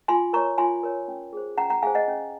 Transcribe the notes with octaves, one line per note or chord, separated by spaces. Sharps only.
F4 G#5 C6
A#4 C#5 A#5 C#6
F4 G#5 C6
A#4 C#5
C#4
G#4 C5
C#4 F#5 A#5
F#5 A#5
G#4 C5 F5 G#5
D#5 F#5
C#4